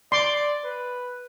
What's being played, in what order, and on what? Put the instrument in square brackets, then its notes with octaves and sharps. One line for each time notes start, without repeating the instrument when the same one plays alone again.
[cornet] D5 [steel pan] C6 D6
[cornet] B4